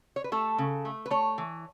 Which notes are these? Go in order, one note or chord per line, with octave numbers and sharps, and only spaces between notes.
C#5
B4
A3 A4
C#3
A3
B4
A3 C#5
E3